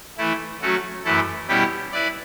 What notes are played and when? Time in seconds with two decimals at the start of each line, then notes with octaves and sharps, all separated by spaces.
0.18 E3 A3 E4
0.61 F#3 A3 C#4 F#4
1.04 F#2 E3 A3 E4 A4
1.48 B2 G3 C#4 E4 G4
1.92 E4 B4 D5